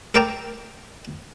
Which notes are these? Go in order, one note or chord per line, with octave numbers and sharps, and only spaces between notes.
A4 A#4 D5 G5 A5 A#5